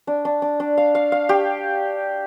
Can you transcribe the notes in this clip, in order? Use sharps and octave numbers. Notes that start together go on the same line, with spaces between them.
D4
D4
D4
D4
F5
F5
F5
G4